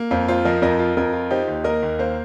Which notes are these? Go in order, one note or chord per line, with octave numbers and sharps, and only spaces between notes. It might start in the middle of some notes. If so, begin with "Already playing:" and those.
Already playing: A#3
F2 C5 F5
F4 C5 F5
F3 A#4 D#5
F2 A#4 D#5
F4
F2 A#4 D#5
F4
D#4 G4 C5
D#2
A#3 A#4 D#5
D#2
A#3 C5 F5